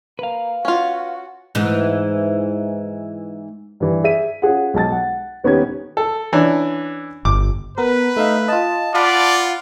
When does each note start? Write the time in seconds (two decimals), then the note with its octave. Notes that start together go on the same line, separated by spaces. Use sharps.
0.19 A#3 B4 F5
0.65 C#4 F4 F#4
1.55 G#2 E3
3.80 G2 E3
4.04 G#4 E5 B6 D#7
4.42 C#4 F4 G#4 F#5
4.74 B1 G#3 A5 A6
4.92 F#5
5.44 D#1 B3 C#4 D#4 G4 G#6
5.97 A4
6.33 E3 C#4 D4
7.25 G1 D6
7.78 B3 A#4 B4
8.17 A3 D#4 E5 F5
8.48 F4 D#5 A5
8.94 F4 D5 F5 F#5 A5 B5